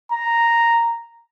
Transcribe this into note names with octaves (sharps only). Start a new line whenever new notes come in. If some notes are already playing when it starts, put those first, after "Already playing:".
A#5